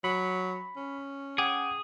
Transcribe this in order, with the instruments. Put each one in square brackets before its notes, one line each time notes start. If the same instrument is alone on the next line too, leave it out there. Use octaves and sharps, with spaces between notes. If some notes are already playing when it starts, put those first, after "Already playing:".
[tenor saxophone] F#3 [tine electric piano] B5
[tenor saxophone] C#4
[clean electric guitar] G#4 [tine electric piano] F#5 G5 D6